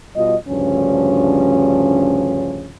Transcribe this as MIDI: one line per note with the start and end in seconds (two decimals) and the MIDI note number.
0.16 0.36 47
0.16 0.36 55
0.16 0.36 65
0.16 0.36 75
0.48 2.75 38
0.48 2.75 43
0.48 2.75 49
0.48 2.75 53
0.48 2.75 61